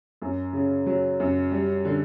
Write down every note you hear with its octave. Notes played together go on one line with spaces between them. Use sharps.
F#2
C#3
F#3
F#2
G3
D3